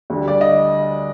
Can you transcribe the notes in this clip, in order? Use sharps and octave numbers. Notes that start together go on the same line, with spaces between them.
D2 D3 G3
D5
D#5